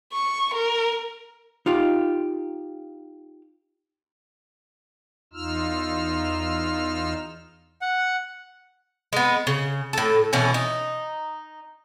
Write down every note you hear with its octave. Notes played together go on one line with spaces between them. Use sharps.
C#6
A#4
D#4 F4 G4
E2 D#4 F4 E6 F6
F#5
G#3 B3
C#3
A2 A4
B2 E3 C#4
D#4